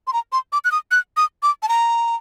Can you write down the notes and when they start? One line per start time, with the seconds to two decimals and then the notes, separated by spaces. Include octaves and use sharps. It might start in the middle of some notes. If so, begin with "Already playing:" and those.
0.07 C6
0.13 A#5
0.32 C6
0.52 D6
0.65 F#6
0.72 D#6
0.91 F#6
1.17 D#6
1.43 D6
1.63 A5
1.69 A#5